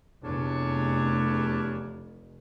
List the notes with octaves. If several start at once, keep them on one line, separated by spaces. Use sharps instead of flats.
F1 E2 D4 C#5